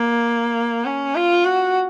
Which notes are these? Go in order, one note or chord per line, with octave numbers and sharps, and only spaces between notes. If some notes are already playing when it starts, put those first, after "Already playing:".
Already playing: A#3
C#4
F4
F#4